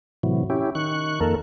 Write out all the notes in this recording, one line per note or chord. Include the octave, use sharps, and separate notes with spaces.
A2 C3 E3 F#3
C#4 E4 G4
D#3 C#6 F#6
F2 D#3 A#3 A4 A#4